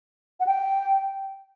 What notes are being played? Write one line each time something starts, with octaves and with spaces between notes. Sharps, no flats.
F#5
G5